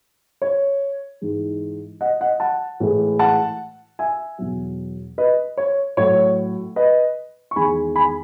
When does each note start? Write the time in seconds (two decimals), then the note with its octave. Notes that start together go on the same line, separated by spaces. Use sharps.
0.42 C#5
1.21 G#2 E3 G#3
2.01 D#5 F#5
2.21 D#5 F#5
2.40 F#5 A5
2.80 A2 E3 G#3
3.19 F#5 A5
3.99 E5 G#5
4.38 E2 B2 F#3
5.18 B4 D#5
5.57 C#5
5.97 A2 F#3 C#5
6.76 B4 D#5
7.51 C#6
7.56 E2 D#3 G#3 G#5 B5
7.96 G#5 B5